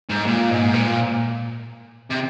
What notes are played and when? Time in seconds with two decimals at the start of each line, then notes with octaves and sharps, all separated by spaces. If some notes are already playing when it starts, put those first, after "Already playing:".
0.09 G#2
0.26 A#2
0.50 G#2
0.73 A#2
2.10 C3